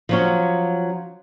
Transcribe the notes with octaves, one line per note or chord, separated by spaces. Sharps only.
F3 F#3 C#4